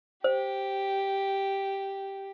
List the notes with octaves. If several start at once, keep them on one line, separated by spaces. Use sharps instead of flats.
G4 C5